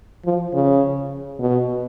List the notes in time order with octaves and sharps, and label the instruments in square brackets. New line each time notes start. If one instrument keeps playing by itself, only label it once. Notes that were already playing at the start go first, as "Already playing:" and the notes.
[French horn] F3
C#3
B2